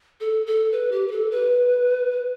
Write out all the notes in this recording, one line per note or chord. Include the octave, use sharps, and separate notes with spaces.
A4
A4
B4
G4
B4
A4
B4